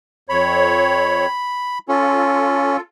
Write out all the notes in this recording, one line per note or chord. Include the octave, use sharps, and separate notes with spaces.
F2 C#5 B5
C#4 F4 A4